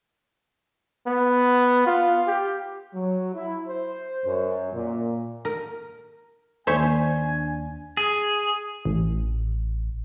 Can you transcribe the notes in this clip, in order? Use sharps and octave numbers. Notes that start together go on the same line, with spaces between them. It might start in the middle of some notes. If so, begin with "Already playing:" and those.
B3
F4
G4
F#3
E4
C5
F#2
A#2
A#4
D#2 D4 C5 C#5 E5 G#5
G#4
A1